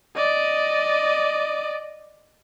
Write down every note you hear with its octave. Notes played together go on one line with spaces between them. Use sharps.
D5 D#5